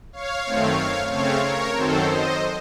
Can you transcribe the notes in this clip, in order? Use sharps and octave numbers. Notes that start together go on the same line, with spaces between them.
C#5 F5
F#2 D#3 A3 C4
C#3 A3 C4 C#5 F5
A#4 C#5
F#2 D#3 F#3 C4 A4 C5
C5 D#5